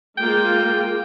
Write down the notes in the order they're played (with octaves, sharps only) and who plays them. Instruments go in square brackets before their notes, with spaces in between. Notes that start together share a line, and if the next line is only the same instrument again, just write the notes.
[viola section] G#3 A#3 F4 [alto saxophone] G5